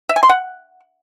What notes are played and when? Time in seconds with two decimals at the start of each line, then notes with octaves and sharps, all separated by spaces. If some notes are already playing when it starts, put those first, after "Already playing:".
0.09 E5
0.16 G#5
0.23 C6
0.29 F#5